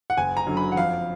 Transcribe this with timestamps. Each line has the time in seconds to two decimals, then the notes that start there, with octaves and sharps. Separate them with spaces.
0.10 F#5
0.17 F#1 G#5
0.37 A#5
0.47 F#2 D3 F#3
0.57 B5
0.72 F#5
0.76 F2 F5